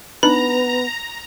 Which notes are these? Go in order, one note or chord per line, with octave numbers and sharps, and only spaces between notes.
B3 D4 D#4 B4 A#5 B5